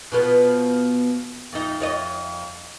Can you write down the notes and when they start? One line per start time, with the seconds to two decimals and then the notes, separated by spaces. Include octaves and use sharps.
0.12 B2 F3 B3
1.53 F2 D#4
1.80 F2 C#5 D#5